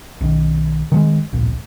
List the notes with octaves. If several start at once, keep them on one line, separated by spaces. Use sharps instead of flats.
B1 D#3
D#3 F3 G#3
D1 A#1